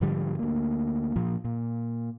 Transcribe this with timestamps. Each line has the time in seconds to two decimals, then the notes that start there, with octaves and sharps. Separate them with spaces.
0.01 G#2 D3 F3 G3
0.39 D2 A#3
1.16 A#2 F3
1.44 A#2